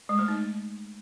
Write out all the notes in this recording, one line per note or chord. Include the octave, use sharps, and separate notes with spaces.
G#3
A3
D#4